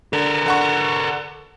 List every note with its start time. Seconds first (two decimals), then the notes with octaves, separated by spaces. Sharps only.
0.13 D3 A4 A#4
0.46 D3 F#5 C#6